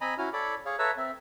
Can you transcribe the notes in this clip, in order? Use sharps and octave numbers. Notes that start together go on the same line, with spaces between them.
C4 D#5 G#5 A#5 B5
C#4 E4 F#4 F6
A4 C#5 D5 B5 D6
G#4 C#5 F5
A4 B4 C#5 E5 A#5 E6
C4 E5